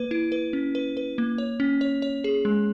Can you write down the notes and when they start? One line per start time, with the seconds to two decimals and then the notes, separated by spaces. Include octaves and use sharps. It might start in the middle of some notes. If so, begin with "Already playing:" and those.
Already playing: A#3 B4
0.11 E4
0.32 B4
0.53 C#4
0.75 B4
0.97 B4
1.18 A#3
1.38 C#5
1.60 C#4
1.81 C#5
2.02 C#5
2.24 G#4
2.45 G#3